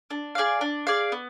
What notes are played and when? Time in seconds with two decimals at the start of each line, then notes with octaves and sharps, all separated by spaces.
0.10 D4
0.35 G#4 D5 F5
0.61 D4
0.87 G#4 D5 F5
1.12 B3